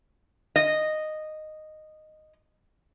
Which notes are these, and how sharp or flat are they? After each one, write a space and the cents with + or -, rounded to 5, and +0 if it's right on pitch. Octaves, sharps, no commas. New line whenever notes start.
D#5 -10